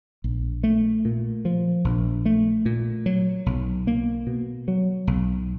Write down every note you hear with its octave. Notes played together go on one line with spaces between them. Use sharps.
A#1
A3
A#2
F3
A#1
A3
A#2
F#3
B1
A#3
B2
F#3
B1